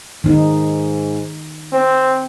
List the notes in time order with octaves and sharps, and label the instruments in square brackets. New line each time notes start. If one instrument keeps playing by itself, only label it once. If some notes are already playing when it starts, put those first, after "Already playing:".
[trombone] G#2 [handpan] D#3 D#4
[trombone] C4